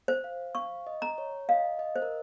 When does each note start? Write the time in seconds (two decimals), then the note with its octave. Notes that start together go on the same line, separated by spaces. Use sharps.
0.08 C5
0.24 F5
0.55 F5 C#6
0.87 D#5
1.02 A#5
1.18 C#5
1.49 D#5 F5
1.79 D#5
1.96 C5
2.02 A#4